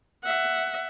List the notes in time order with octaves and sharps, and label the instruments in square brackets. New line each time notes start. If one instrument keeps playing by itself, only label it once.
[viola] E5 F#5